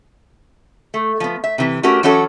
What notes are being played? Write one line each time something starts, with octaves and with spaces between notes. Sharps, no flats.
A3
F3 B3
E5
C3 E3
A3 C#4 F#4 G4 A#4
E3 F#3 C#4 F#4 A4 C#5